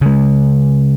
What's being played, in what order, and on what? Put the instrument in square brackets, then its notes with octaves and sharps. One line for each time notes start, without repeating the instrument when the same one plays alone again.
[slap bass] C#3 G#3